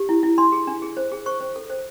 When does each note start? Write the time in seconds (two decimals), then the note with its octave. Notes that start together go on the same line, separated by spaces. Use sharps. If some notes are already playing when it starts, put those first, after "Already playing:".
Already playing: G4
0.09 E4
0.23 E4
0.38 D4 C6
0.52 G#4
0.67 D4
0.82 G#4
0.97 C5
1.12 G#4
1.26 C5 C#6
1.40 C5
1.56 A4
1.70 C5